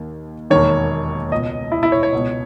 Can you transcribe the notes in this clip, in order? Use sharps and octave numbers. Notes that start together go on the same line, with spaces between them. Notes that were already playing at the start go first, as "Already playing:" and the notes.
Already playing: D#2 D#3
E1 D#2 D#3 C#5
C#2 B2 D#5
E4
E4
C#5
C#5
C#2 B2